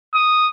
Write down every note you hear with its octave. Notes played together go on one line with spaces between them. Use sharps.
D#6